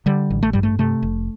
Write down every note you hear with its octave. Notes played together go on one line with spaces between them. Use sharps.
D3 G3
A1
A3
G2 G3
A3
C3 A3
F1